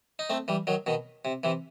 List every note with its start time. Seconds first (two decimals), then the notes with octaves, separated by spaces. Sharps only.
0.19 D#4
0.30 A3 C4
0.48 E3 G3
0.67 D#3 F#3
0.86 B2 D#3
1.25 C3
1.43 C3 E3